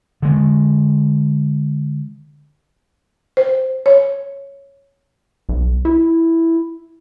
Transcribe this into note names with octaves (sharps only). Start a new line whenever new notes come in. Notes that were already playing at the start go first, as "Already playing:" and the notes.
D3 G#3
C5
C#5
B1
E4